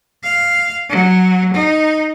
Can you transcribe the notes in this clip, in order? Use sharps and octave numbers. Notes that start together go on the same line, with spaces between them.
F5
F#3
D#4